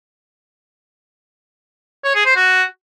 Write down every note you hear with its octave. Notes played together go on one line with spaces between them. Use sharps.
C#5
G#4
C5
F#4